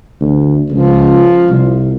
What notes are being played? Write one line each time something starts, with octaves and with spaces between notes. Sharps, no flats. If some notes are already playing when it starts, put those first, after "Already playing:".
D2
C#2 F3
C2